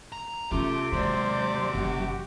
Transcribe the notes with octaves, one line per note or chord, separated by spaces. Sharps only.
A#5
C3 A3 B3 C#4 F4 D6
D#2 F#3 G#3 B3 C5 D5
F#1 F#4 G4